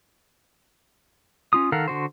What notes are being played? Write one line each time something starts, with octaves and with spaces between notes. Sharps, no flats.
C#4 F4 D#6
D#3 A4 A#4 F5 F#5
D3 F#4 C5